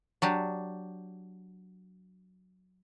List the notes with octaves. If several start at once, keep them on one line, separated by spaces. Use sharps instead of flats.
F#3 D4 G4